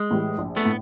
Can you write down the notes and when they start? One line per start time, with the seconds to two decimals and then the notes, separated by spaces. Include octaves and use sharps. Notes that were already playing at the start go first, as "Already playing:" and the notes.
Already playing: G#3
0.11 A2 E3 G3
0.38 A#1
0.57 A3 B3
0.65 A2